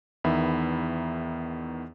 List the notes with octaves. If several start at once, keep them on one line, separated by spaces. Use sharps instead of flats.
E2 D#3 B3 E5 B5